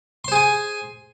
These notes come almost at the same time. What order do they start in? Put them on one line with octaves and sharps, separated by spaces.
C6 C5 G#4 G#5